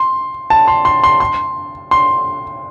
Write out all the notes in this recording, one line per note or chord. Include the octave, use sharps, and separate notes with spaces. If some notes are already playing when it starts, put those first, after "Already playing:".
Already playing: C6
A5
C6
C6
C6
C6
C6